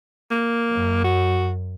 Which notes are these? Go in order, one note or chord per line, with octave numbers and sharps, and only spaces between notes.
A#3
F#2
F#4